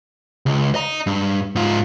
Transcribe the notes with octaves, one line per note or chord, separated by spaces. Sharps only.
C#2
D#5 A#5
G2
G#2 F4